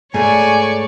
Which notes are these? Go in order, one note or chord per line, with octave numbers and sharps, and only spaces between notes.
G#2 A3 C#5 D5 G#5 C#6